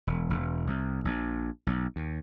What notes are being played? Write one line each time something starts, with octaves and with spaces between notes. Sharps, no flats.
E1
E1
C2
A#1
B1
D#2